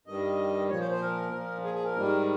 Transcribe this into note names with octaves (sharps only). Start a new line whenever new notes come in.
G2 D#3 G3 D#5
A#2 F3 C#5
C5
C5
A#4
A#2 F3
G#4
G#4
A#4
G#2 D#3 G3